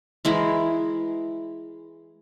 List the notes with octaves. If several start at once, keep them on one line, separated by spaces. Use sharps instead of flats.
E3 G#3 E4 A#4